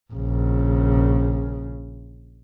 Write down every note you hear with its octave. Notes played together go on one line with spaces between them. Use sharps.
A#1 C#3